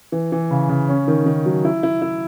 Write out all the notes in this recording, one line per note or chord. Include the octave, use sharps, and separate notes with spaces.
E3
E3
C#3
C#3
C#4
D#3
D#3
F#3
E4
E4
E4